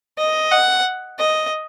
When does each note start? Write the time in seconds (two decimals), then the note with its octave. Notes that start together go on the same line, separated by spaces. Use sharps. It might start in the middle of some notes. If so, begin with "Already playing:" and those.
0.18 D#5
0.51 F#5
1.18 D#5